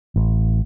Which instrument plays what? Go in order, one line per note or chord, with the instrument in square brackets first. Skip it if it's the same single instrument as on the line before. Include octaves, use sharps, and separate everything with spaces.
[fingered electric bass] A1